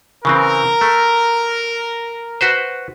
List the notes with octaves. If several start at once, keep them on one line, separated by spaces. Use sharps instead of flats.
C#3 E3 C4 A#4
A3
F#4 B4 C5